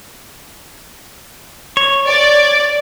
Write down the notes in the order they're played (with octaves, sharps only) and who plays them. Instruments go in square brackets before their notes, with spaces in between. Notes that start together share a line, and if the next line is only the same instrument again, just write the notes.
[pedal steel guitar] C#5
[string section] D5